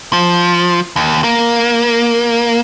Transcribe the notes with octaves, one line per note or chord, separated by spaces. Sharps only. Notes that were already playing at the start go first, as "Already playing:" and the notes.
F3
D#2
A#3